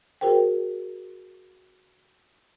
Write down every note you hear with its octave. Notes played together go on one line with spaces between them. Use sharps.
F#4 G#4 A#4 C5 G5